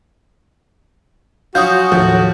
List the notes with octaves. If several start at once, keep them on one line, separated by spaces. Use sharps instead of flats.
F3 F#3 C#4 F4 F#4 D#6 G6
D#2 A2 F3